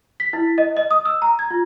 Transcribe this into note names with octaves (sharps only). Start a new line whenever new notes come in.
B6
E4
D#5
D#5
D#6
E6
A#5
G#6
F4